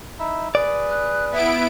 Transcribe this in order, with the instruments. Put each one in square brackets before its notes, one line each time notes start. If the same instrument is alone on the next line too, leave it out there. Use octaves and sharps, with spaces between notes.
[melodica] D#4 E4 E5
[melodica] G#4 B4 [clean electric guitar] D5
[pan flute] F#6
[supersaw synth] B3 E4 D7 [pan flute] E5